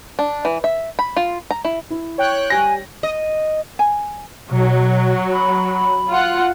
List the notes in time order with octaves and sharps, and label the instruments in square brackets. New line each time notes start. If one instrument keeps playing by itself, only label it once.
[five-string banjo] D4
E3
E5
B5
F4
A#5
E4
[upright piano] E4
[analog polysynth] C#5 G5 F#6
[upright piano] G3 A#6 [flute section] G#5
[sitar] D#5
[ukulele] G#5
[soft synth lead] B2 [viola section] F#3
[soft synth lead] B5
[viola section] F4 F#5